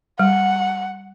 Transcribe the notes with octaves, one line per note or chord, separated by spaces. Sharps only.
G3 F#5